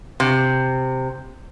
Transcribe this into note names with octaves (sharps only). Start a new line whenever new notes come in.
C3